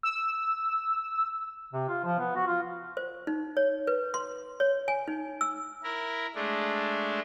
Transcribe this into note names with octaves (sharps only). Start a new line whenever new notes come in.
E6
C3
F4
F3
B3
F#4
F4
C5
D#4
C#5
B4
C6
C#5
G#5
D#4
E6
E4 A#4
G#3 A3 D4